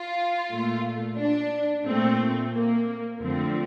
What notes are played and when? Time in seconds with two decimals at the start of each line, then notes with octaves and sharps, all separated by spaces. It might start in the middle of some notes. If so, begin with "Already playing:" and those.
Already playing: F4
0.50 A#2 A3
1.18 D4
1.86 A#2 A3 C4
2.53 A#3
3.21 F2 D3 F3 A3 C4